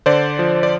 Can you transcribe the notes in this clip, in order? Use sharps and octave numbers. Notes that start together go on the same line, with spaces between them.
D3 C5 D5
F3
D5